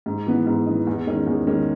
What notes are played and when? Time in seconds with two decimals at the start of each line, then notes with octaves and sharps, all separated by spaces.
0.06 G#2
0.27 E3 B3 D#4
0.47 G#2
0.66 E3 B3 D#4
0.87 E2
1.07 D#3 G#3 C#4
1.27 E2
1.47 D#3 G#3 C#4